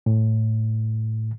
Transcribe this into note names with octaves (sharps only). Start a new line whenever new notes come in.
A2